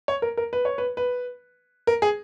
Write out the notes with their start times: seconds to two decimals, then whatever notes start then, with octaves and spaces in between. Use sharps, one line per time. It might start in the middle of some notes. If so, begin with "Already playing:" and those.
0.08 C#5
0.22 A#4
0.37 A#4
0.53 B4
0.65 C#5
0.78 B4
0.97 B4
1.87 A#4
2.02 G#4